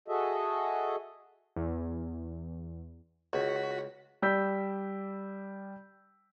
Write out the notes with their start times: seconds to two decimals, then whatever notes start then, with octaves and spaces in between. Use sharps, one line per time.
0.08 F#4 G#4 A4 D#5 E5
1.56 E2
3.33 C#2 F#4 B6
4.22 G3 D5 E6 G6 B6